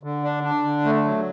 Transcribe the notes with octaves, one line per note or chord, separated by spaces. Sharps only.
D3
D4
D4
D3
A3
F#3